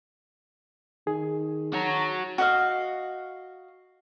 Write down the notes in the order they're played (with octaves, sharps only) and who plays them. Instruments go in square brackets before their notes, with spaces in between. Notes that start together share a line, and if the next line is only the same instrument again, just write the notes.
[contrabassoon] D#3 [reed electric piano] G#4
[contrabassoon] D#3 [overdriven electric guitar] F#4 C#5 [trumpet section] A5 A#5
[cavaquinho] F#4 D#5 F5